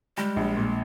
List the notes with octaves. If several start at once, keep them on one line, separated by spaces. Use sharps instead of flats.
G3 G#3
A#1
A#2